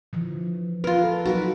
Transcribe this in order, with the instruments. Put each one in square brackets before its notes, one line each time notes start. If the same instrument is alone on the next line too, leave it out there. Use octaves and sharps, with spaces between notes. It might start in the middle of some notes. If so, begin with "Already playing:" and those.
[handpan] D3 E3 F3
[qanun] F4 A#4 [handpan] B4
[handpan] A4
[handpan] F3 F#3 D#4 [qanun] F#4 A#4 B4